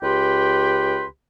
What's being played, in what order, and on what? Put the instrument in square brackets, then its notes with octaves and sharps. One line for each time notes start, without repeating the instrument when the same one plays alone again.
[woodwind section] C#2 G4 B4 G5 C6